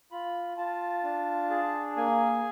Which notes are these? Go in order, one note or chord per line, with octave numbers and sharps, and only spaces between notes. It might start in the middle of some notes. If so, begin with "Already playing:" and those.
F4 B5
F4 A5
D4
G#4
A#3 G#5